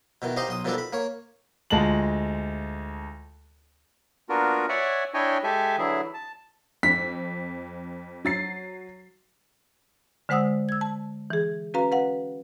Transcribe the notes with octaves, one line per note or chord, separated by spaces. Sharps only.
B2 D#3 E3
D#4 G4 C5 D#5 F5
B1 C6 D#6
B2 D#3 F3 G3 D4 A4
B5
A#3 C#5
D2 G#3 F4 A5 F#7
A#3 B3 D4 F4 F#4 A#4
C#5 D5 E5 F#5 G#5
D4 E4 C#5 D#5 G5 G#5
G#3 G4 A4 E5 G#5
D3 E3 F#3 E4 G#4
A5
F2 B6
F#3 A6 C7
D3 G#3 C5 F#5 D#6 E6
E6 G#6
A5
E3 G#4
C#4 F#4 B4 F5 A#5
B4 F5 F#5